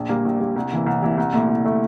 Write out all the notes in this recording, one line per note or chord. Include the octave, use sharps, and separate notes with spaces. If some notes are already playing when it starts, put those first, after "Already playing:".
Already playing: A#1
A#2 G3 A#3
A#1
A#2 G3 A#3
C2
C3 E3 A#3 E4
C2
C3 E3 A#3 E4
C2
A#2 A3 E4
C2
A#2 A3 E4